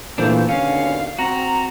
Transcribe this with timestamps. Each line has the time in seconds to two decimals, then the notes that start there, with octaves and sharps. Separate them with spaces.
0.18 A#2 E3 A3 D4 F4 C5
0.49 D#2 B2 D3 C#4 F5
1.19 C4 F#4 A#5